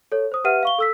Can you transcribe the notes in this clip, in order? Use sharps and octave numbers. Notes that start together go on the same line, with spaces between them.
A4 C#5
C5 D#6
G4 B4 E5 F#5 F6 D#7
F5 C#6 G7
A4 E6 B6